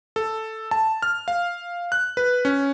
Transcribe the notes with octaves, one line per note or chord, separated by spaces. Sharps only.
A4
A5
F6
F5
F#6
B4
C#4